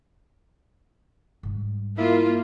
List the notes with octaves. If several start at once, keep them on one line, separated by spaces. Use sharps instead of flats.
G#2 G3
A#3 E4 F4